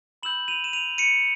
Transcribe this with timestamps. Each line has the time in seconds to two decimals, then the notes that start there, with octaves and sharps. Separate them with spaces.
0.23 B5 E6 G6 E7 F#7
0.48 D#7 F7
0.64 E7
0.73 D#7 F7
0.98 C#7 D#7